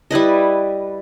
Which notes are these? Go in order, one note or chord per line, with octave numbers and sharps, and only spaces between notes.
G3 E4 B4 D#5